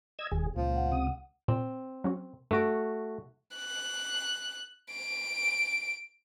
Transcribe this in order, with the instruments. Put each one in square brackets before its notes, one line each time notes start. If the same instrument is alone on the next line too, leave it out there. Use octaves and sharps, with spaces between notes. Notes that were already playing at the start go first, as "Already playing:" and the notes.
[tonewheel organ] D#5 E6 G#6
[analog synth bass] E1 [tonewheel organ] D#2 G#4
[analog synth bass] C#2 [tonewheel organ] A#2 [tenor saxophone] F3
[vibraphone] F#5
[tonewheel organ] C3 D#6
[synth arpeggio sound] A#2 [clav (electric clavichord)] C4
[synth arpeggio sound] F#3 C#4 F#4
[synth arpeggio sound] G2 D7 [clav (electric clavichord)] A3 F#4
[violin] F#6
D7